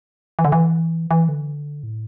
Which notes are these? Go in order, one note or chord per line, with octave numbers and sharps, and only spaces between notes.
E3
D3
E3
E3
D3
A2